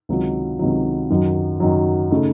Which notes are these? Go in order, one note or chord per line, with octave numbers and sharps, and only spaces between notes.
C#2 C3 D#3 F#3
C#2 C3 D#3 F#3
F#2 D#3 F#3
F#2 D#3 F#3
C#3 A3 D#4